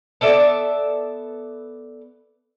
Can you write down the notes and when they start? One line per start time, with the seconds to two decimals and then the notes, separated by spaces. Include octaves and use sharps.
0.21 B3 A4 D5 E5